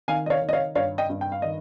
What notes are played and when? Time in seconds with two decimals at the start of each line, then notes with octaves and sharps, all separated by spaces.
0.08 D#3 F5 G#5
0.26 D#5
0.30 C#5 F5
0.42 D#3
0.49 D#5
0.53 C#5 F5
0.75 G2 C#5 F5
0.98 D#5 G5
1.10 G2
1.21 G5
1.32 F5
1.42 D#3 D#5